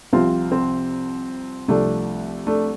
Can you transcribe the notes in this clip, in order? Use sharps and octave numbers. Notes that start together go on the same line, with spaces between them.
C2 C3 F3 C4 F4
C4
C2 C3 F3 A3 D4
A3 D4